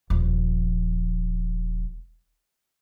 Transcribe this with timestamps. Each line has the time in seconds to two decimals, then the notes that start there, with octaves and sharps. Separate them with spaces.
0.10 D#1 F3